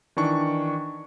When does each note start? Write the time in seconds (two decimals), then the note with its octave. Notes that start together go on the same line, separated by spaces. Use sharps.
0.17 D#3 E3 D4 C#6